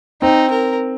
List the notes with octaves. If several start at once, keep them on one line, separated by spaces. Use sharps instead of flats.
C4 D#4
A#4